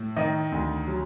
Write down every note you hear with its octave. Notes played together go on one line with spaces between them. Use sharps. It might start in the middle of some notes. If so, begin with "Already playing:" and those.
Already playing: A2
D#3 D#5
D2
F#3